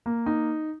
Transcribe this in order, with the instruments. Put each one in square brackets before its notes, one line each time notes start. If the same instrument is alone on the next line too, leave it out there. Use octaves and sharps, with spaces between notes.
[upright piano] A#3
D#4